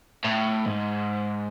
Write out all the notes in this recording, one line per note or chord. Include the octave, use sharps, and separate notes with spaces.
A2
G#2